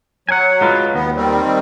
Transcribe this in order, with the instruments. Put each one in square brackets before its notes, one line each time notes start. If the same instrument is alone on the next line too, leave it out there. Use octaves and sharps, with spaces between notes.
[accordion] F#3 [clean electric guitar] F#5 G#5
[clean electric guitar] G#3 F4 B4
[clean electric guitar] D#2 [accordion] B3
[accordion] D#3 G3 C4